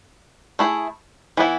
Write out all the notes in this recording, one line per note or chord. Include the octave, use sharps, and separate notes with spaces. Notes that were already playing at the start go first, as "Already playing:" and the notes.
A3 E4 G#4
E3 B3 E4